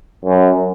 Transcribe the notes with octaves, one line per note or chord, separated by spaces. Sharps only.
F#2